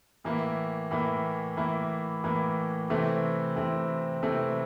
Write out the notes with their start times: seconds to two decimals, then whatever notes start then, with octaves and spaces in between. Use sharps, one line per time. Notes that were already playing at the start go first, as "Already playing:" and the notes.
0.24 A2 E3 A#3 E4
0.91 A2 E3 A#3 E4
1.57 A2 E3 A#3 E4
2.24 A2 E3 A#3 E4
2.90 C3 E3 A3 C4 E4
3.56 C3 E3 A3 C4 E4
4.23 C3 E3 A3 C4 E4